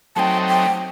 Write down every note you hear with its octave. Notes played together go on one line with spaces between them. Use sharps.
F#3 A3 C4 D#4 G5 A5
G5